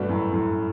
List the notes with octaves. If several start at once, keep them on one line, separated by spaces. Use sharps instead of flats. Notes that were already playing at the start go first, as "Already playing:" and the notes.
Already playing: G2 B2 A3 D4 F#4 B4
F#2 A2
F#2 A2